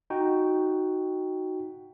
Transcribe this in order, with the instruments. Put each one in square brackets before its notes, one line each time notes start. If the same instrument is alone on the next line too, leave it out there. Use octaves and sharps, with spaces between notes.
[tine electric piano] D#4 F#4 G5